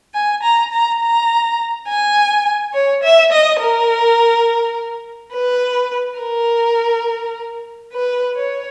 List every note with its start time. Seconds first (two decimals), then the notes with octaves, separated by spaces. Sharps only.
0.14 G#5
0.43 A#5
0.72 A#5
1.00 A#5
1.88 G#5
2.73 C#5
3.03 E5
3.32 D#5
3.60 A#4
5.34 B4
6.20 A#4
7.93 B4
8.36 C#5